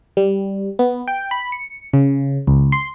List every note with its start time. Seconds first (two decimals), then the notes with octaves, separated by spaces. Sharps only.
0.17 G3
0.79 B3
1.08 G5
1.31 B5
1.52 C#7
1.93 C#3
2.47 C#2
2.72 C6